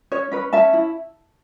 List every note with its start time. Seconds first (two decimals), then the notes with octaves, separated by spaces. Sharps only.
0.12 C#4 C#5
0.32 C#4 B4
0.53 C#4 E5 A5
0.73 E4